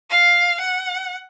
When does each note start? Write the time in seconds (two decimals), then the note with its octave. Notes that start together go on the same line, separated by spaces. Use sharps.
0.10 F5
0.60 F#5